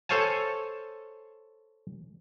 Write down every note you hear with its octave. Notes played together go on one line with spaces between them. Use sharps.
A4 C5 C#5 F5 G#5 A5